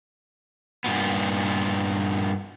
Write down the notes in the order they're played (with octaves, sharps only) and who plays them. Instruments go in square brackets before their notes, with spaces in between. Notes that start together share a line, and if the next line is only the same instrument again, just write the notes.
[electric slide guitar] G2 A#2 B3